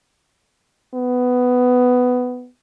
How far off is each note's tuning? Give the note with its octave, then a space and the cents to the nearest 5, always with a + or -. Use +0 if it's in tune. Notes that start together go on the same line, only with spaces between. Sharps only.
B3 +10